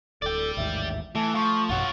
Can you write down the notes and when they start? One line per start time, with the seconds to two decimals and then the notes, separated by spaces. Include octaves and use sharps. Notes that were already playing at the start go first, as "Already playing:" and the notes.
0.22 D1 A4 D5 G5
0.57 A1 D#2 G#2 E5
1.15 E3 A3 A5
1.35 F3 C#6
1.69 A1 F#2 B2 F4 C#5 F#5